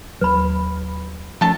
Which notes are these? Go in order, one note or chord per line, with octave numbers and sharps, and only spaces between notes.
D#2 F#3 B4 B5
D#3 F3 A3 C#4 A4 A5